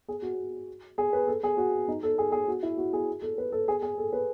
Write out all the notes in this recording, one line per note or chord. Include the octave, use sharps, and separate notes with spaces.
G#4
F#4
G#4
B4
A4
G#4
F#4
D#4
A4
G#4
G#4
F#4
E4
F#4
G#4
A4
B4
A4
G#4
G#4
A4
B4